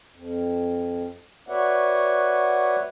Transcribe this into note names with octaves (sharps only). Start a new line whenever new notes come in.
F2
F#4 B4 C#5 D5 E5 F#5